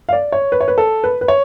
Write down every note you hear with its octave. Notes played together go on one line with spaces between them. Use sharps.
F5
D5
C#5
B4
C#5
B4
A4
B4
B4
C#5